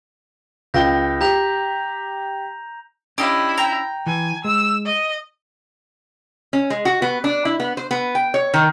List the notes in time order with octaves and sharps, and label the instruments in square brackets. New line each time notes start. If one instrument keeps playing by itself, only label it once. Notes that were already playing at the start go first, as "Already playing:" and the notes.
[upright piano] C#2 G5 G7 [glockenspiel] G6 A#6
[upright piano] G4 [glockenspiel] A#5 G6 F7
[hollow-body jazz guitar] C#4 D4 [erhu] E4 [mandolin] G4 D#5 F5
[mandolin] G5 A#5
[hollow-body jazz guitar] E3 [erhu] G#5
[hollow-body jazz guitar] G#3 [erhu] E6
[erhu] D#5
[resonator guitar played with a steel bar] C#4
G#3
F#4
B3
D4
E4
B3
C5
B3
G5
C#5
D#3